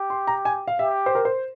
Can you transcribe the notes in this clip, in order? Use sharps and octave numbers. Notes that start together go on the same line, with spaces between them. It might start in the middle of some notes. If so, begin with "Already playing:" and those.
Already playing: G4
C6
A#5
G#5
F5
G4 E5
C5
A#4
C5